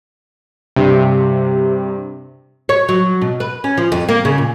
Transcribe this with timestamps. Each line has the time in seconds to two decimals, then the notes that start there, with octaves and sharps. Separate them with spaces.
0.76 G2 C3
2.69 C#5
2.89 F#3
3.22 B2
3.40 B4
3.64 C#4
3.78 F3
3.92 F2
4.09 A#3
4.25 C#3
4.38 A#2